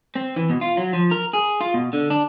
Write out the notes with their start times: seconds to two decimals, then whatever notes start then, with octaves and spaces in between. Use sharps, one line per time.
0.15 C4
0.36 E3
0.50 B2
0.61 F4
0.77 F#3
0.93 F3
1.11 A#4
1.33 G#4
1.61 F4
1.74 B2
1.93 D3
2.10 D4